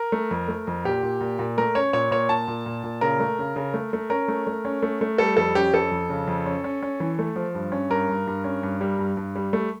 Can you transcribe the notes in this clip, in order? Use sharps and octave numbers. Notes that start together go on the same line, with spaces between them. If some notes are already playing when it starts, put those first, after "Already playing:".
Already playing: A#4
A3
F2
A3
F2
A#2 G4
A#2
A#2
A#2
A3 A#4
C#4 C#5
A#2 C#5
A#2 C#5
A#2 A5
A#2
A#2
A#2
C#3 A#4
A3
C#3
C#3
A3
A3
C#4 A#4
A3
A3
C#4
A3
A3
G3 A4
F2 A4
C#4 G4
F2 A4
F2
C#3
F2
C#4
C#4
C#4
E3
A3
F3
G2
C#4
G2 A#4
G2
G2
C#4
G2
G3
G2
G2
G3
A3